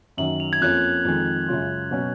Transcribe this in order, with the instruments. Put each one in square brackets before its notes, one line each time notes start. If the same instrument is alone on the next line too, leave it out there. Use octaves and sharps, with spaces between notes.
[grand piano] F#2 D#3 F#3 [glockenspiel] F#7
[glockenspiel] F7
G#6
[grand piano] F2 F3 A#3 C#4 [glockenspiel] F#6
[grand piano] F2 D#3 G#3
F#2 C#3 G#3 C#4 F4
B2 F#3 C#4 F#4